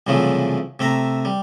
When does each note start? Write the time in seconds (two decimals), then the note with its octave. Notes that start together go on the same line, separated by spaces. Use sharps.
0.07 C2 F#2 C#3 E3 F3 A3
0.79 C3 A3 E5 A#5
1.25 G3